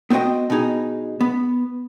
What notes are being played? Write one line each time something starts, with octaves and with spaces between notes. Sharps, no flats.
B3 C4 F#4 C5 D#5 G5
B2 B3 D#4 G#4
B3